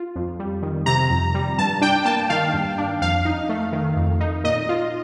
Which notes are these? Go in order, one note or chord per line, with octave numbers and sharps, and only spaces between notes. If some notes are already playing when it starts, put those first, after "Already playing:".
Already playing: F4
F2
G3
D#3
C3 A#5
F2
G3
G2 A5
D4 G5
A#3 A5
D#3 F5
G2
D4
F2 F5
D#4
A3
D#3
F2
D#4
A#2 D#5
F4